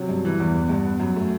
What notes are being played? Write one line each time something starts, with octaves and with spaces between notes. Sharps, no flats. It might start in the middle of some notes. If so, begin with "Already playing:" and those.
Already playing: C3 F#3
G2
E3
E2
B3
G2
B3
F#2
A3